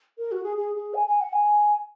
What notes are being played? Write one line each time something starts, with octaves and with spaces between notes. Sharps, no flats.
A#4
F#4
G#4
G#4
G#4
G#5
G#5
F#5
G#5